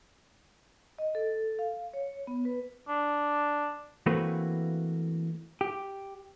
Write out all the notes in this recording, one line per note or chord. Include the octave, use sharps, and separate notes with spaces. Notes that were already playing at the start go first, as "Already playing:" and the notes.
D#5
A4
F5
C#5
B3
B4
D4
E3 A3 A#3 C4 F#4 B4
G4